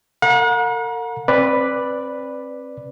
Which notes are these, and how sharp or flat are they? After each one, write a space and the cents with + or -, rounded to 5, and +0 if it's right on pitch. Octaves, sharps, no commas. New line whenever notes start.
A#4 -45 F#5 -40 A#5 +35
C4 +30 B4 +0 D5 +0